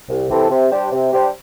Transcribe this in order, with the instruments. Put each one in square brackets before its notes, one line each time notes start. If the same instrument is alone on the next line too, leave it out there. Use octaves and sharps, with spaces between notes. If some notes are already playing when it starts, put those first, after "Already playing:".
[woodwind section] C2
C3 E3 C4 A4
C3
G3 D4 G4 C5
C3
G3 D4 G4 C5